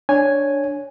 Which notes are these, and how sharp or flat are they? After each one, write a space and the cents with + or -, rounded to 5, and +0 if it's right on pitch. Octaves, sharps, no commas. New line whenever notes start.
D4 -5 C#5 +0 G#5 +0